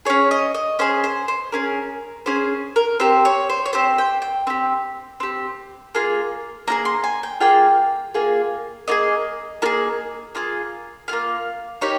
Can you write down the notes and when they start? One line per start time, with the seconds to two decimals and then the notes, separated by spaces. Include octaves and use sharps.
0.05 C#4 G#4 C#5
0.31 D#5
0.55 D#5
0.79 C#4 G#4 C5
1.04 C5
1.28 C5
1.52 C#4 G#4 A#4
2.26 C#4 G#4 C5
2.76 A#4
3.00 C4 G4 C5
3.25 C#5
3.50 C5
3.66 C#5
3.73 C4 G4 C5
3.98 G5
4.22 G5
4.47 C4 G4
5.20 C4 G4
5.95 A#3 F4 G#4
6.67 A#3 F4 G#4 A#5
6.85 C6
7.04 G#5
7.23 G5
7.40 A#3 F4 G#4 G5
8.14 A#3 F4 G#4
8.88 A#3 F4 G#4 D#5
9.62 A#3 F4
9.66 G#4
10.35 A#3 F4 G#4
11.08 A#3 F4 G#4 F5
11.81 A#3 D#4 G4 C#5